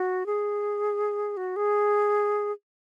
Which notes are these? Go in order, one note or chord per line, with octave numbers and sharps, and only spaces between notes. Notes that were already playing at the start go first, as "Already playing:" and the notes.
Already playing: F#4
G#4
F#4
G#4